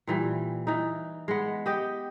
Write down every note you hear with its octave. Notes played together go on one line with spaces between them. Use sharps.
A#2 E3 G3
E3 D#4
G#3 B3
G4 D#5 G5